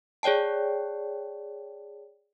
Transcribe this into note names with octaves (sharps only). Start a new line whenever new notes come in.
G#4 C#5 D5 G5 A5